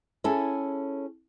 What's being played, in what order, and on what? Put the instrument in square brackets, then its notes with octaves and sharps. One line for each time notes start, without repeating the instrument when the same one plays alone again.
[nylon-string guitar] C#4 E4 G#4 A4